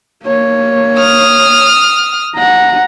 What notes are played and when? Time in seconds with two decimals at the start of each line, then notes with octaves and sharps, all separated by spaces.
0.24 A#3 C#5
0.99 D#6 F6
2.36 F#5 A#5